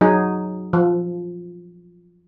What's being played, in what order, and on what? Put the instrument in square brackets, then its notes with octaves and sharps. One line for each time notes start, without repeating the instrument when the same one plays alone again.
[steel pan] F#3 D#4 G#4
F3